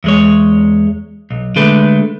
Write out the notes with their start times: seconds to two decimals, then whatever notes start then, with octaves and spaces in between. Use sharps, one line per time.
0.04 E2 G#3 C#5
1.31 B1
1.56 D3 G#3 A3 B4